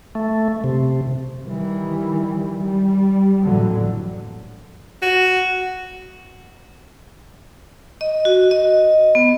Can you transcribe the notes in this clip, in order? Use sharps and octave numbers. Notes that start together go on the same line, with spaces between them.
A3
C3
D#3 E3 G3
G3
A1 F2 A#2 D3 E3 F#3
F#4
D#5
F#4
D#5
B3